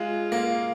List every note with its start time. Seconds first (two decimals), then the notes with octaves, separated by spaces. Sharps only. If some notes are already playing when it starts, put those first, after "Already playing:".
Already playing: G#3 F4
0.32 A#3